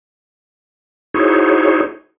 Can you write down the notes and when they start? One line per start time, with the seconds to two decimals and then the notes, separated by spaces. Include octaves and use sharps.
1.14 D#4 E4 F#4 G#4 C5 C#5